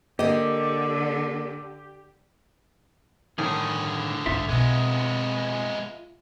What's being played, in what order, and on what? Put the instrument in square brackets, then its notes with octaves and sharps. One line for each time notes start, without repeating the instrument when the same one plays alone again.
[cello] D3 [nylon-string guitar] A#3 D#5 [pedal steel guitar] G4
[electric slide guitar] A2 D#3 G3 [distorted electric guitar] D3 G#4
[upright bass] G#2 A3 [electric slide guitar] F4 E5
[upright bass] B2 C4 [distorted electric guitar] G#3 B3